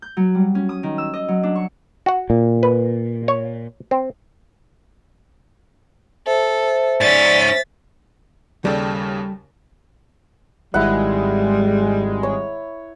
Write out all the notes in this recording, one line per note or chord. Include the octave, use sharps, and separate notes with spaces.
G6
F#3
G3
C#4
D#6
D#3
E6
D#5
F#3
D4
C#6
F#4 F#5
A#2
B4
C#5
C4
A4 C5 E5
G#2 C#4 D5 A6 B6
D#2 C#3 G3 A4
G#1 G3 G#3 E4 F#5
C#5